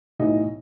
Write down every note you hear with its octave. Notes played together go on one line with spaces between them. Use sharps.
B1 A2 E3 D#4 D#5